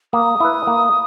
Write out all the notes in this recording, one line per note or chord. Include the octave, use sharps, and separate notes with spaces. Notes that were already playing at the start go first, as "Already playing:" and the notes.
A#3 D#6
E4 B4
A#3